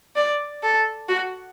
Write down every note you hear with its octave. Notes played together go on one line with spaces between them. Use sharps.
D5
A4
F#4